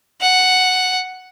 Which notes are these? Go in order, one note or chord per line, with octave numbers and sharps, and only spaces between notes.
F#5